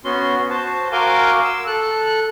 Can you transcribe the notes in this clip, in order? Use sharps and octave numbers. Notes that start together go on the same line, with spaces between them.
B3 C#4 F#4 C6
F#4 C5 A5
F#4 A#4 F5 G#5 C6 D6
E6
A4 F#6